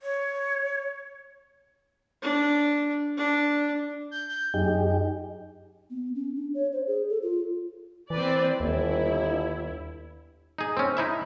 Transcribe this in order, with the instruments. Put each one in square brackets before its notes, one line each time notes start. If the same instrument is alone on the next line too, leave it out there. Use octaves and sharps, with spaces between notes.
[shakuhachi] C#5
[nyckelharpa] D4
D4
[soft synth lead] G6
G6
[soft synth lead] F#2 [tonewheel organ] D#4 G4 G#4
[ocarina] B3
C#4
D4
C#5
C5
G#4
A4
F4
[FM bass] E3 [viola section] C4 B4 D5
[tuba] G1 [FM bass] D#2 [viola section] E4
[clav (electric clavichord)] D#4 G#4
C4 C#4
D#4 E4 E5